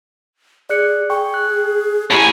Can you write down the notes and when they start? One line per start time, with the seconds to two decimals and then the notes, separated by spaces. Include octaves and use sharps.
0.70 G#4 D5 F#6 C#7
1.10 G#4 G5 C#6
1.34 F#6
2.11 A2 E4 G4 G#5 C#6